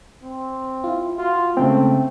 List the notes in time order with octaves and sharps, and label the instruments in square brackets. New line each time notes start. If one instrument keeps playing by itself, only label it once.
[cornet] C4
[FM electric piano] E4 F4
[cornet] F4 [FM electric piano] F#4
[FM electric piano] C#3 G#3 [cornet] A3 [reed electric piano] C4 G5